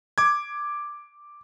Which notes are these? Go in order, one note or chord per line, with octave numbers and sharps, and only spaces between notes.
D6 G#6